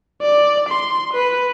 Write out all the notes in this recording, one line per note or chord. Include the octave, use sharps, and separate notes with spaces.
D5
C6
B4